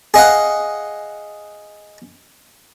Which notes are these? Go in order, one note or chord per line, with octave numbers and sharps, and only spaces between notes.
G#4 D#5 F5 F#5